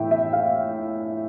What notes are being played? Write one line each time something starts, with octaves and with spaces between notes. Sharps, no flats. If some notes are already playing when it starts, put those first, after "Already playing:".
Already playing: A2 E3 E5 G5
E5
F5